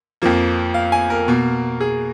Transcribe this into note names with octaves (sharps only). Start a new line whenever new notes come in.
F2 F3 A#3
F5
G#5
A#4
B2 A#3
G#4